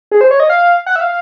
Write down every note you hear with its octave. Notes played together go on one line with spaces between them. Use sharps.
G#4
C5
C#5
D#5
F5
F#5
E5
F5